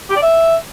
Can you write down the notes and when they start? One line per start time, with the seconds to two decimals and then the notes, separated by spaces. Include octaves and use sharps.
0.10 G4
0.16 D5
0.22 E5